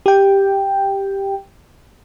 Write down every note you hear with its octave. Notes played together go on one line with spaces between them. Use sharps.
G4 G5